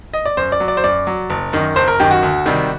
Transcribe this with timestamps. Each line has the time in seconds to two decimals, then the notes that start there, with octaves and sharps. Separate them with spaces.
0.14 D#5
0.26 D5
0.37 F#2 C5
0.52 D5
0.60 F#3
0.68 D5
0.77 C5
0.84 F#2 D5
1.07 F#3
1.30 F#1
1.53 F#2 D#3
1.76 F#1 C5
1.88 A#4
2.00 F#2 D#3 G4
2.11 F#4
2.23 D2
2.46 C3 D#3 G3